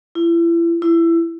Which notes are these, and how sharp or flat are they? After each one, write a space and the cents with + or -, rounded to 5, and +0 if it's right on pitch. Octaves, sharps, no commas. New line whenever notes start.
E4 +35
E4 +20